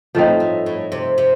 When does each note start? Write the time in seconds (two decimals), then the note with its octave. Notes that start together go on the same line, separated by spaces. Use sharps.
0.15 A2 F3 A3 C4 D#4
0.40 A2
0.66 A2
0.92 C3
1.18 C3